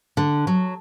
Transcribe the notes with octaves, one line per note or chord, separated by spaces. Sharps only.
D3
F#3